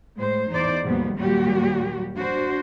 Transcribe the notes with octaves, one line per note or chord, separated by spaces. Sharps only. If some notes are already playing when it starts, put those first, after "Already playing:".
A2 G#3 C5
E2 D#4 C5 D5
D#2 G#2 B2 F3 G3 B3
D#2 A#2 F#3 G3 F#4 G4
D4 F#4 C5